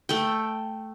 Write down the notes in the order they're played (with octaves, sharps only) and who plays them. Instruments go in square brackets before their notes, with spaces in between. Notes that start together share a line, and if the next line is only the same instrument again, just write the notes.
[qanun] A3 G5